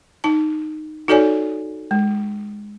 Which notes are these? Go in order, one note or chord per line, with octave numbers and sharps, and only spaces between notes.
D#4 A5
D#4 F#4 A4 C#5 D5 G#5
G#3